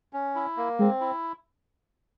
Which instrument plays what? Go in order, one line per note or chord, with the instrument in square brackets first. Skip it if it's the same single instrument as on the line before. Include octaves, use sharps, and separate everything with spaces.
[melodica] C#4
E4
A#3
[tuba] G#3 [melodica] C4
[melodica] E4